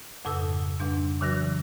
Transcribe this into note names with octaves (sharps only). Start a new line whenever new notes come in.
F2 G#2 C#3 A4 D#6 E6
F2 C#3 G3 D4
C#3 E3 F#3 F#4 A#6